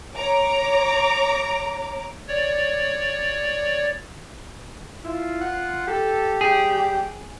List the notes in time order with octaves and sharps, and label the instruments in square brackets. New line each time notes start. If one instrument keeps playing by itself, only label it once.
[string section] C#5 A#5 D6
[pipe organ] C#5 D5
[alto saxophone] E4 [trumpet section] F4
[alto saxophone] F#5
[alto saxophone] G4 [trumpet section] A4
[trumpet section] G3 G5 [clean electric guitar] G#4